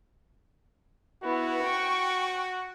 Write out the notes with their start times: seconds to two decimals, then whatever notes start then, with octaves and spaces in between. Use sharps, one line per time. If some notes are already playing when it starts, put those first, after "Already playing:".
1.23 B3 E4 F#4
1.63 G5 C#6